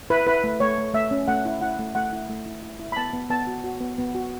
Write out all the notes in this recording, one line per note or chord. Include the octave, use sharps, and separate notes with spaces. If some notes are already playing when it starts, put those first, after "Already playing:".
E4 B4
E4 B4
A3
A3 C#5
A3
A3 E5
C#4
A3 F#5
E4
E4 F#5
A3
A3 F#5
E4
A3
E4
E4
E4
B5
B3 A5
B3
B3 A5
F#4
F#4
B3
B3
F#4